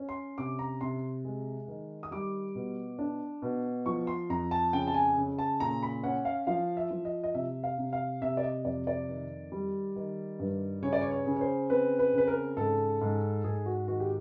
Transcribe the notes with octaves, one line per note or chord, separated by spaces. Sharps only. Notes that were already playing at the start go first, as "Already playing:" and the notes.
Already playing: C#4
C6
C3 D6
A#5
C3 C6
G#3
D#3
D#6
G3 D6
B2
D4
B2
F3 C#6
C6
F2 A#5
A5
C#3 G5
A5
G#5
C#3
A5
A#2 A#5
B5
C#4 F#5
F5
F3 F5
E5
F3
D#5
D#5
C3 E5
F5
C3
F5
C3 E5
D5
D#5
F2 D5
D5
D#3
G3
D#3
G2
C#3 C#5
D5
C#5
C#5
C#3
C#5
C5
C4 B4
B4
C#3 B4
A#4
G#2 A4
G#2
G#2 G#4
F#4
D#3 F#4
G4